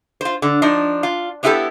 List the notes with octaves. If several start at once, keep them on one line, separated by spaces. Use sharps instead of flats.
F4 C5
D3
F3 D4 D#4
F4
B3 C#4 E4 F4 G4 A4